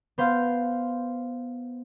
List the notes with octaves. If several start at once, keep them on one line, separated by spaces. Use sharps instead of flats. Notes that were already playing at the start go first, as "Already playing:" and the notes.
B3 C5 F5